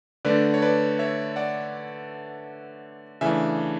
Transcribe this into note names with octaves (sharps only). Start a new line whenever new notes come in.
D3 A3 D4 B4 D5
C#5
B4 D5
C#5 E5
D5 F#5
C#3 E3 A3 D4 E5 G#5